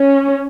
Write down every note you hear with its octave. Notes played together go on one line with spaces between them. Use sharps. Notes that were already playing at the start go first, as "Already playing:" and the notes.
Already playing: C#4